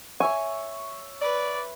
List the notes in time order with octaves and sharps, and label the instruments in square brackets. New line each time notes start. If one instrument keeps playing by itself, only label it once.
[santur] C#5 E5 C#6 [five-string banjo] G#5
[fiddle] B4 [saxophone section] D5